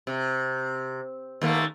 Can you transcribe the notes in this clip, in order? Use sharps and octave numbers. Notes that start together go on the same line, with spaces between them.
C3
D#2 A3 A#3